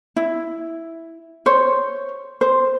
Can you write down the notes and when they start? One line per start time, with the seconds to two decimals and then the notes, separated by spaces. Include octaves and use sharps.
0.16 E4
1.46 C5 C#5
2.41 C5